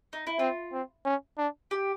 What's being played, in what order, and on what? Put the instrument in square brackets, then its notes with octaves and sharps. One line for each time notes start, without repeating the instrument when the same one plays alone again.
[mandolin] D#4
E4
[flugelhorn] C4 [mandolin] F4
[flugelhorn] C4
C#4
D4
[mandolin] G4